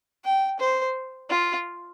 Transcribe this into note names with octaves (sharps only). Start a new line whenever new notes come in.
G5
C5
F4